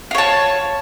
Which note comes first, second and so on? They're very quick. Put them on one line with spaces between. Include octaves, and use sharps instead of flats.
F4 C#5 A5